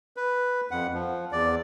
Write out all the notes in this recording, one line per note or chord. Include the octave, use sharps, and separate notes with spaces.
B4
F2 F#5
F3
E2 D5